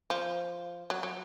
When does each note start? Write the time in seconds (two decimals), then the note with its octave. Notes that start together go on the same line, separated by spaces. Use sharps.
0.10 F3
0.90 F#3
1.03 F#3